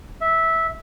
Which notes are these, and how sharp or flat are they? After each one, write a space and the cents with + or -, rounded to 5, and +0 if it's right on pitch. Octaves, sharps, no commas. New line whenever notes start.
E5 -10